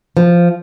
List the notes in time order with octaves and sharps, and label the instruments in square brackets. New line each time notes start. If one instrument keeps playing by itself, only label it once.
[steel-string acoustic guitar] F3